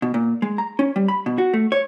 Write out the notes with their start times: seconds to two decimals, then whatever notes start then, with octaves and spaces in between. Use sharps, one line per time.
0.02 B2
0.14 A#2
0.42 G#3
0.58 A#5
0.79 C#4
0.96 G3
1.08 B5
1.26 B2
1.38 F#4
1.54 A3
1.72 C#5